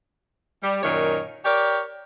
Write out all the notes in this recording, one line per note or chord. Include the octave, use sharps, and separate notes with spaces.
G3
F#2 A#2 D#3 A#4 C#5
G4 A#4 C#5 D5